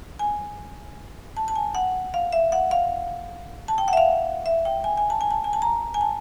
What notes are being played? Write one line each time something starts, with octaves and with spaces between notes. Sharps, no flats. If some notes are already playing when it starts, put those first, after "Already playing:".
G#5
A5
A5
G#5
F#5
F5
E5
F#5
F5
A5
G5
F#5
E5
F5
E5
G5
G#5
G#5
A5
G#5
A5
G#5
A5
A#5
G#5
A5